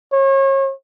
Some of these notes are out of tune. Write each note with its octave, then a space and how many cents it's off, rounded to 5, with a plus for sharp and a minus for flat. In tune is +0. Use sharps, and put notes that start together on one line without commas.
C#5 -35